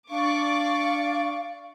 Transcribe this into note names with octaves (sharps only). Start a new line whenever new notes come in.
D4 D5 F5 C#6 D6